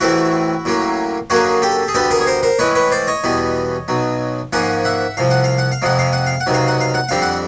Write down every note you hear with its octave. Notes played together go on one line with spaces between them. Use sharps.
A1 A2 E3 A3 C4 E4 F#4
A2 F#3 A#3 C#4
F#2 D3 F#3 A#3 C#4 F#4 G#4
G4 A4
G#4
D2 D3 G3 B3 G4 A4
G#4 A#4
C#5
A#4 C5
A#4 C5
A2 E3 G#3 C#4 B4 C#5
B4 C#5
C5 D5
C#5 D#5
E2 B2 G3 B3
B1 B2 F#3
G#2 F3 A#3 C#4 F#5 G#5
E5 F#5
C2 C3 F3 F5
F#5
F5
F#5
F5
F2 C3 F3 G#3 F#5
F5
F#5
F5
F#5
C#2 C3 D#3 F#3
F5
F#5
F5
F#5
F2 D3 G3 C4 F5
F#5